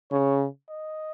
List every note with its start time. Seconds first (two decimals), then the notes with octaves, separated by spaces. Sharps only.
0.12 C#3 C#5
0.70 D#5